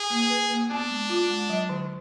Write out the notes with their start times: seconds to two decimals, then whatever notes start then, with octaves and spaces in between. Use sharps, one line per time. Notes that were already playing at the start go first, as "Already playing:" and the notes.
Already playing: G#4
0.10 A#3
0.30 B4
0.50 A#3
0.70 B3 D4
0.90 G#3
1.09 F4
1.30 G#3
1.50 F#3
1.69 D3